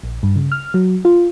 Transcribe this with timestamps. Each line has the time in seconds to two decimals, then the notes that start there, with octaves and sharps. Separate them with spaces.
0.03 A#1
0.23 G2
0.36 C#3
0.52 F6
0.74 F#3
1.05 F4